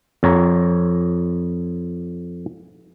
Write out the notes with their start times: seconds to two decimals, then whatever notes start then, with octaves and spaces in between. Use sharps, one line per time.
0.23 F2 C#5 A#5